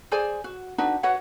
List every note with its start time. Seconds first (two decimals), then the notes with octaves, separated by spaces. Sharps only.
0.12 G#4 C5 D5 G#5
0.44 F#4
0.78 D4 D#4 F#4 B4
1.03 F#4 B4 C#5 F#5